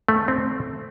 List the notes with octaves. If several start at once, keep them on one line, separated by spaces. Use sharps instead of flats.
A3
C4